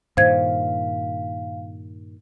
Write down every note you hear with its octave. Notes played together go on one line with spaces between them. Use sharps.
G2 A#2 D#3 C5 F5 G#6